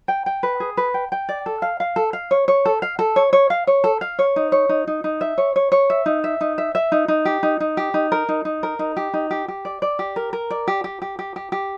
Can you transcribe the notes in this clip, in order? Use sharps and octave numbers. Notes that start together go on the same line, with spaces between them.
G5
G5
B4
G#4
B4
G5
G5
D5
A4
F5
F5
A4
F5
C#5
C#5
A4
F5
A4
C#5
C#5
F5
C#5
A4
F5
C#5
D#4
C#5
D#4
D#4
D#4
E5
C#5
C#5
C#5
E5
D#4
E5
D#4
E5
E5
D#4
D#4
G4
D#4
D#4
G4
D#4
A#4
D#4
D#4
A#4
D#4
G4
D#4
G4
G4
D5
D5
G4
A#4
A#4
D5
G4
G4
G4
G4
G4
G4